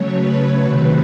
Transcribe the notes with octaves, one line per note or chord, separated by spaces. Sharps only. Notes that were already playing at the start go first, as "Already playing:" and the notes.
Already playing: C#3 F#3 A3 C#5
B4
C3 D#3 F#3 A3 C4